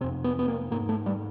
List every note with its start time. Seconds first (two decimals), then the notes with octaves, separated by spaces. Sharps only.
0.01 F2 C3 C4
0.24 B3
0.39 B3
0.48 A#3
0.71 G#2 A#3
0.89 A3
1.06 G3